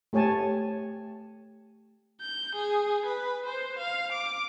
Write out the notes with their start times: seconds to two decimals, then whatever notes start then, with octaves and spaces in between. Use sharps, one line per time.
0.13 A3 G4 C#5 G#5 A5
2.20 G6
2.55 G#4
3.05 B4
3.46 C5
3.78 F5
4.12 D6